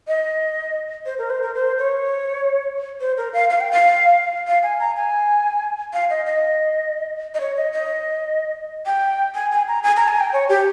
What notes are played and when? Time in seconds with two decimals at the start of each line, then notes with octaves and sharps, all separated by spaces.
0.08 D#5
1.06 C5
1.18 A#4
1.30 C5
1.43 A#4
1.55 C5
1.79 C#5
3.01 C5
3.17 A#4
3.33 F5
3.50 F5
3.61 G5
3.71 F5
4.47 F5
4.63 G#5
4.80 A#5
4.97 G#5
5.93 F5
6.10 D#5
6.26 D#5
7.34 D#5
7.40 C#5
7.57 D#5
7.73 D#5
8.86 G5
9.35 G#5
9.51 G#5
9.68 A#5
9.83 G#5
9.97 A#5
10.08 G#5
10.20 G5
10.33 C#5
10.49 G4